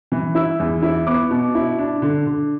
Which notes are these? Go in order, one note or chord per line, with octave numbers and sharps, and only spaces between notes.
E3
E4 E6
E2
E4
B3 D6
B2
E4
D4
D3
D3